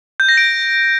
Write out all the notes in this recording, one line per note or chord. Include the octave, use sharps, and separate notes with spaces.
G6
A#6
D7